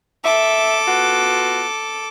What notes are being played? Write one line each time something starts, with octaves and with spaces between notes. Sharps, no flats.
A4 E5 D6
B3 F4 F#4